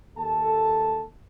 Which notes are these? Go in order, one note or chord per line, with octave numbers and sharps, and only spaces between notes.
D#2 A4 A5